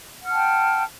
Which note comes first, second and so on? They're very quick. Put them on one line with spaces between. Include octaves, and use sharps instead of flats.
F#5 F6 A5 G5